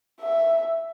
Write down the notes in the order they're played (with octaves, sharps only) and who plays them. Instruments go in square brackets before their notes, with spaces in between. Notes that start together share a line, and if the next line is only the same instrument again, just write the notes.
[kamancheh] E5